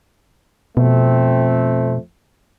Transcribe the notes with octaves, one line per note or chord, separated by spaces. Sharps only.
F2 B2 A3 C4